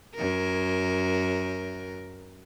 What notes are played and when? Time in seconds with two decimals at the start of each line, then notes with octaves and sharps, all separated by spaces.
0.15 F#2 A#4